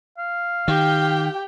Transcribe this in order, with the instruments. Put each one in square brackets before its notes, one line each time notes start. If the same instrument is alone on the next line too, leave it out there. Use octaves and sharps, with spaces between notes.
[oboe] F5
[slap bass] D#3 [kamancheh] G4 G5